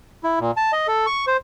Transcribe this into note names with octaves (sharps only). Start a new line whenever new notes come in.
E4
A#2
A5
D#5
A4
C#6
C5